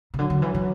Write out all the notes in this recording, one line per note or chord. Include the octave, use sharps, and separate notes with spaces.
C3
D3 F#3
D3
E3
E3